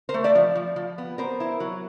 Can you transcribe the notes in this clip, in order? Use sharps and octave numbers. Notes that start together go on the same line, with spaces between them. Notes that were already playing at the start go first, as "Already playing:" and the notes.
A#4 C5
A3
D5 E5
F3
F3
F3
B3
B3 A#4 C5
E4
F#3